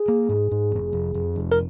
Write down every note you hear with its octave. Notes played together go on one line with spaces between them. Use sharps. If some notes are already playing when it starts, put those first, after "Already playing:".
Already playing: G#4
A#3
G#2
G#2
F1
F2
F2
F1
A#4